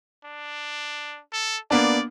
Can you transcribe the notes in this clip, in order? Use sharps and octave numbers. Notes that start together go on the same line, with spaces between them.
D4
A4
A#3 B3 D4 D5